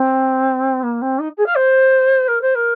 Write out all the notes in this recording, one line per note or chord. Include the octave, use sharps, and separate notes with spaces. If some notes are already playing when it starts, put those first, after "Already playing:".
Already playing: C4
A#3
C4
D#4
G#4
F5
C5
A#4
C5
A#4